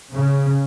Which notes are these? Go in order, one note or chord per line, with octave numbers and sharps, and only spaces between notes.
C#3